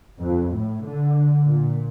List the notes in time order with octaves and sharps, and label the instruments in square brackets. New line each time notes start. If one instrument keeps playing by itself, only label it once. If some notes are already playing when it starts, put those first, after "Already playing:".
[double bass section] F2
A2
D3
A#2